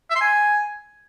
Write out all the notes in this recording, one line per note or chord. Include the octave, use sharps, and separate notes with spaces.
E5
C6
G#5